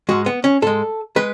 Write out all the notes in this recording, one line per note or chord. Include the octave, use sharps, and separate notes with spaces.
G#2 G#3 F#4
B3
C#4
G#2 G#3 A4
G#3 B4